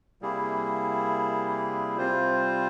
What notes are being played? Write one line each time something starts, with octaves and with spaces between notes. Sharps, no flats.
C3 G3 A#3 E4 G#4
C3 G3 C4 F4 C5